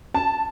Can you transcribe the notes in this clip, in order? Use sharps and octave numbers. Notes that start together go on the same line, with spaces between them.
A5